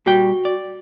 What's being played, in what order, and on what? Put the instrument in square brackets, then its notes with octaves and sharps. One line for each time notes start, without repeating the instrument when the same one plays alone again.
[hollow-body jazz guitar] A#2 G3 G5 [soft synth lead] F#4
[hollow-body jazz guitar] D5